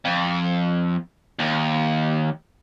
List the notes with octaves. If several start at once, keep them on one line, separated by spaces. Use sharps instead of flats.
F2
D#2